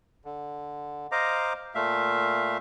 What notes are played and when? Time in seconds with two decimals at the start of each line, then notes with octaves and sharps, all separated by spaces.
0.25 D3
1.12 C5 D#5 F5 A#5 D6
1.75 A#2 A3 E5 F5